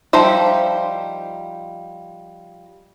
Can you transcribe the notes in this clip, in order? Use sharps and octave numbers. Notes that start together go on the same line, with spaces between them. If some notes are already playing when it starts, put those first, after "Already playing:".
F3 G3 D#4 C5 E5